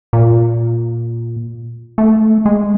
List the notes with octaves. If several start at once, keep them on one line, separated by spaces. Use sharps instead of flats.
A#2
A3
G#3